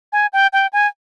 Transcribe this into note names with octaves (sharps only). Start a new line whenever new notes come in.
G#5
G5
G5
G#5